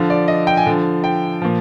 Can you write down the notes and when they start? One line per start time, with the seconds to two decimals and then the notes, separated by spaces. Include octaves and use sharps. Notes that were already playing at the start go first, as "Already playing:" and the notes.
Already playing: D3 F3
0.10 D5
0.28 D#5
0.47 G5
0.57 G#5
0.66 D3 F3
1.04 G5
1.42 A#2 F3